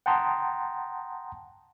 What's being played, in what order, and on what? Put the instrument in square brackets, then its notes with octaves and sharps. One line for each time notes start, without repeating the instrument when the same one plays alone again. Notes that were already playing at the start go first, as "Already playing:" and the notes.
[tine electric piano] F#5 G5 A5 A#5 C6 D#6